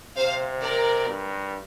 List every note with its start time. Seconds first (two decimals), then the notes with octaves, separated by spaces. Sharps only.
0.17 C3 C5 F5
0.61 A#4 D5
1.07 G2